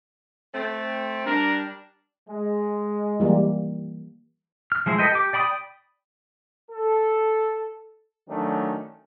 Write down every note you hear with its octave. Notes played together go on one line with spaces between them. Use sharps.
A3 C4
G3 D4 A#4
G#3
E3 G3 A#3
F6
F3 G#3 E4 C5
A4 B4 D#5 G5
G4 D6
D5 G5 B5 D6 D#6
A4
D#3 F#3 A3 C#4 D4